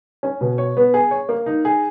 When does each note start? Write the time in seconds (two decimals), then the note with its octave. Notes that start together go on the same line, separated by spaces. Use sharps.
0.23 C#4
0.41 B2
0.58 C#5
0.77 B3
0.94 G#4
1.11 C#5
1.29 A#3
1.46 D#4
1.65 G#4